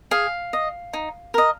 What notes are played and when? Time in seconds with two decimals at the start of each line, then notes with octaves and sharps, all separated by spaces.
0.11 G#4 F5
0.53 D#5
0.93 D#4
1.34 A#4 D#5